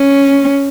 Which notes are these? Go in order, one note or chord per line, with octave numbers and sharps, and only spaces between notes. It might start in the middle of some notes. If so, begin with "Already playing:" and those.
Already playing: C#4